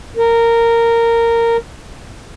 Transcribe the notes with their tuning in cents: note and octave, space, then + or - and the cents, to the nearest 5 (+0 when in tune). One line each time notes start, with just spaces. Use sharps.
A#4 -10